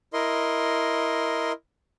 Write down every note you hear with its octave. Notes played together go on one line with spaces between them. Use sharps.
E4 A#4 D#5 C6